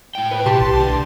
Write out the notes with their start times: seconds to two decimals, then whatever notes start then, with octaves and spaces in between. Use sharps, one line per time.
0.15 A2 G5
0.31 B4
0.46 B2 G4 A5 C6
0.61 B1
0.80 D3